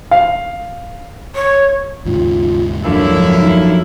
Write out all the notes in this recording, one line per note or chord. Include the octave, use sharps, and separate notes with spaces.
F5
C#5
D#2 G#2 C#3 F4
F#2 D3 F3 A#3 D4 E4
D#4